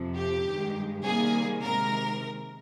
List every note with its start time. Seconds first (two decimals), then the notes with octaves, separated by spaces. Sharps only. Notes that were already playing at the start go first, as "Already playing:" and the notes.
Already playing: F2 C3 F3
0.16 G4
0.46 G2 D#3 G#3
1.04 C3 D#3 G3 A#3 G#4
1.63 C3 D#3 G#3 A#4